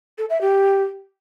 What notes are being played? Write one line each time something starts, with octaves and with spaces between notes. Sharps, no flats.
A4
E5
G4